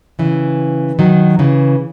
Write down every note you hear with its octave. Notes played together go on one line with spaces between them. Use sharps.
C#3 E3
D#3 F#3
C#3 E3